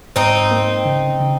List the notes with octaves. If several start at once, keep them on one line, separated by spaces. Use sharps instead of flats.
G#2 C4 D#4
A#3
C#3
C#3